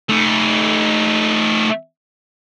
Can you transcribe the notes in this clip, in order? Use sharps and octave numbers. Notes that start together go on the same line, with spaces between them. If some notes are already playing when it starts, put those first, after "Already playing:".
A3 D#4